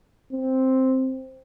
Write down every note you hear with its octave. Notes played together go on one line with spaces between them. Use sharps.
C4